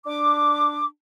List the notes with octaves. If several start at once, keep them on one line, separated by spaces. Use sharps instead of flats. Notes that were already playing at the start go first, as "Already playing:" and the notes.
D4 D6